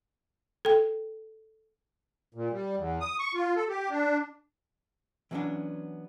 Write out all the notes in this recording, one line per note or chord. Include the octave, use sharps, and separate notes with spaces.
A4 G5
A#2
G3
E2
D#6
C#6
F4
A4
G4
D4
E3 F#3 A#3 B3 C#4 D4